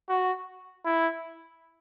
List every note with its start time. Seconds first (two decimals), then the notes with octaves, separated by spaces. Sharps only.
0.09 F#4
0.85 E4